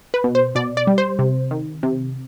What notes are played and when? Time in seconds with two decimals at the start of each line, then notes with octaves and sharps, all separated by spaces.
0.14 B4
0.24 B2
0.35 C5
0.55 B2 D5
0.77 D5
0.87 G3
0.98 C5
1.19 C3
1.51 D#3
1.83 C3